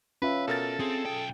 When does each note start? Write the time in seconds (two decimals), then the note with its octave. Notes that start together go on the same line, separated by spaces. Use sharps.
0.22 C#4 F4 B4 E5
0.48 B2 A4 A#4 A6
0.80 C4 G#4
1.06 B1 G5